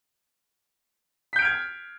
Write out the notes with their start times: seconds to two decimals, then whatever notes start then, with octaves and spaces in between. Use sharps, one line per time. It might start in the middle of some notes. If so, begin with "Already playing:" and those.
1.33 B6
1.36 G6
1.39 D7
1.42 F6
1.45 G#6